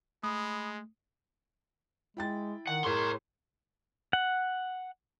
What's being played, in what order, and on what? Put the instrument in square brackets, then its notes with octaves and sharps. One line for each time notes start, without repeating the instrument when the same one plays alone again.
[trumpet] G#3 [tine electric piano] A3 [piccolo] B5 [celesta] D#6
[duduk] G#3 [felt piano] E4 G5 A6
[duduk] D#3 [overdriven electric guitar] F#5
[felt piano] A2 G#4 C#6 [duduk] A#4 [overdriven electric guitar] C#5 C6
[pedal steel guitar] F#5